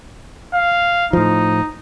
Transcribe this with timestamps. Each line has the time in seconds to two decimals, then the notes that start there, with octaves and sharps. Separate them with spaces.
0.54 F5
1.13 A2 F3 D#4